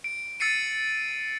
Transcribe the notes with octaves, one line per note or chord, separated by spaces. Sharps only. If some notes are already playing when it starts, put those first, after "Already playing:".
D7
E6 A6 C7 C#7 D#7